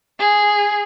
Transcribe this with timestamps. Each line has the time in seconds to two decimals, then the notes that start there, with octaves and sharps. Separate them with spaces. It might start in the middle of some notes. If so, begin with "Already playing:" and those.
0.19 G#4